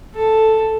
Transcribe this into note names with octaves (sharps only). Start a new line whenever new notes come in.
A4